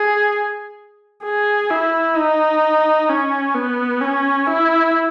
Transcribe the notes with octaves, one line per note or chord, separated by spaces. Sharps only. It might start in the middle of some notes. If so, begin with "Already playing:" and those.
Already playing: G#4
G#4
E4
D#4
C#4
B3
C#4
E4